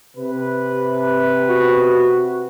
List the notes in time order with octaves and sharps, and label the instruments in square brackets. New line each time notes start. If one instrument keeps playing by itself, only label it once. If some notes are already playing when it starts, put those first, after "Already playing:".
[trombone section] C3 B4
[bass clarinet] F#4